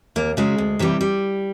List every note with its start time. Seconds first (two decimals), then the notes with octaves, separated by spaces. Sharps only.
0.16 D#2 A#3
0.37 C#3 F#3 G#3
0.58 D2
0.79 C3 E3 G3
1.01 G3